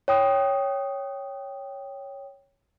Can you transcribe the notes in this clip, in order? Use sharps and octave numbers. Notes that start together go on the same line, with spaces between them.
C#5 G5 D#6